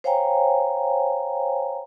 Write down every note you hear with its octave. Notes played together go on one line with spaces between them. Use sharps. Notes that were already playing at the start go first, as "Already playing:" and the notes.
C5 C#5 F5 G5 G#5 A#5